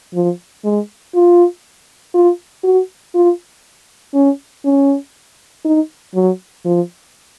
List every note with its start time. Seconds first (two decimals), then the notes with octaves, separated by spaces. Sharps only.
0.14 F3
0.64 G#3
1.14 F4
2.14 F4
2.64 F#4
3.15 F4
4.14 C#4
4.65 C#4
5.65 D#4
6.15 F#3
6.65 F3